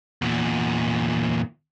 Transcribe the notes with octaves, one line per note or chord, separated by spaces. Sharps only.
E2 A#2